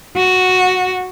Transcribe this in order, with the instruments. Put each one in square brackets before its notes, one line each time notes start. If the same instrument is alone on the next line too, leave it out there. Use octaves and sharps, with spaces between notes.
[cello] F#4